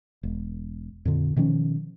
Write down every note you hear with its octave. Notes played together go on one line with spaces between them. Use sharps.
E1
F2 A#2 D3
B2 D#3 F3 C#4